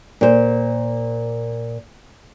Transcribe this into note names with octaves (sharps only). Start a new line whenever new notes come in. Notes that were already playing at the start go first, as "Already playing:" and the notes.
A#2 C5